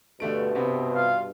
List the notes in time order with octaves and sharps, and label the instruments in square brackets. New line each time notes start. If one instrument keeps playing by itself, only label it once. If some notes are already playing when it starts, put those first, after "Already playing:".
[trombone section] G2 B2 [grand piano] D3 A3 D7
[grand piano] C3 B3 C4
[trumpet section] F4 F5